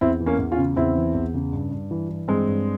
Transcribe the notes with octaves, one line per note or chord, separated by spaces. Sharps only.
E2 C4 E4
E3
A#3 C#4
E2
C#4 F4
C#3
E2 C4 E4
E3
E2
C#3
G2
G2
E3
E3
G2 G#3 C4
G2